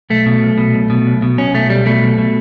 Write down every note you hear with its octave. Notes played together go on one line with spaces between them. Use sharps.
B1 A3
B2
B1
B2
B1
B2
B1
B2
B1 C#4
B2 A3
B1 G3
B2 A3
B1
B2